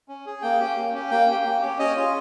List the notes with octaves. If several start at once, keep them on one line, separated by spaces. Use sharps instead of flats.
C#4
G#4
A#3 G5
C#4 G4
A#3
C#4 G4
A#3 G5
C#4 G4
A#3
C#4 G4
C#4 D#5
F4 G#4